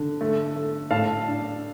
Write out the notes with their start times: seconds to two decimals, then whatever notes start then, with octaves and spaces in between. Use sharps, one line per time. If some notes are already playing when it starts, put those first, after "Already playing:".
Already playing: D3
0.21 A3
0.56 A3
0.91 A2 F5 A5
1.27 D4